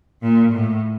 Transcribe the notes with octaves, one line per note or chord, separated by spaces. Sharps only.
A#2
A2